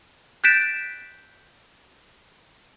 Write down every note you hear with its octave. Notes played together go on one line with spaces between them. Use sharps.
F#6 G6 A6 B6 D7 E7